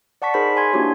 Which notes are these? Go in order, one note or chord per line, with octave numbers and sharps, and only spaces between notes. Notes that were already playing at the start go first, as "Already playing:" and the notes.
D5 F#5 A5 C#6 B6
D#4 G#4 A#4 C5 B5 B6
G#5 C6 G#6
A#3 D4 E4 F#4 G4 C#5